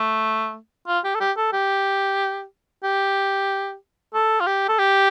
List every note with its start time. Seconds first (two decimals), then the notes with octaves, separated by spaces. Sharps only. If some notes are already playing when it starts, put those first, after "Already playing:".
Already playing: A3
0.88 F4
1.05 G4
1.15 A4
1.20 G4
1.37 A4
1.53 G4
2.84 G4
4.14 A4
4.40 F4
4.47 G4
4.69 A4
4.79 G4